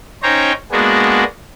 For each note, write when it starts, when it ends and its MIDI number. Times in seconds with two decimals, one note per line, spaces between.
0.23 0.52 61
0.23 0.52 63
0.23 0.52 72
0.23 0.52 73
0.23 0.52 79
0.23 0.52 82
0.72 1.24 56
0.72 1.24 58
0.72 1.24 59
0.72 1.24 62
0.72 1.24 66
0.72 1.24 68